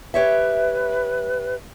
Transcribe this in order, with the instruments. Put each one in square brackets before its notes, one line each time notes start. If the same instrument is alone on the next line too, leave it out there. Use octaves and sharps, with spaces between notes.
[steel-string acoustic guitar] G4 C#5 E5 [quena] B4